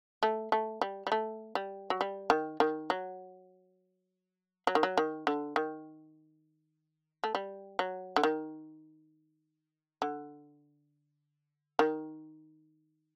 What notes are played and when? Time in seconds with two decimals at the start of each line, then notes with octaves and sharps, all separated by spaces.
0.23 A3
0.52 A3
0.81 G3
1.07 G3
1.12 A3
1.55 G3
1.90 F#3
2.01 G3
2.30 D#3
2.60 D#3
2.90 F#3
4.67 F#3
4.75 D#3
4.83 F#3
4.97 D#3
5.27 D3
5.56 D#3
7.24 A3
7.35 G3
7.79 F#3
8.16 D3
8.23 D#3
10.02 D3
11.79 D#3